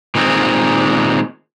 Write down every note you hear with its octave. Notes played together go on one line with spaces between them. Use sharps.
A#2 D#3 G#3 B3 C4